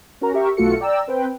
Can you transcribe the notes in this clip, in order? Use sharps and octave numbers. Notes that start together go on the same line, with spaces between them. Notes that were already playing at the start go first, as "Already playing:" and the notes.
C#4 F#4 A#4 A#5
G4 A#4 E5 C#6
B1 A3 F4 F#4 A4 C#7
D5 G5 A#5 E6
C4 B4 G5